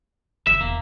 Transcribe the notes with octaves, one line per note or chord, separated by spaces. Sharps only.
F#1 E5
E1 A#3